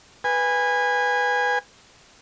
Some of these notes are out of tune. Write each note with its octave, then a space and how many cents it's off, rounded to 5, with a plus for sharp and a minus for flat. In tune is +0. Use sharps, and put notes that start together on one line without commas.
B4 +0 G#5 -20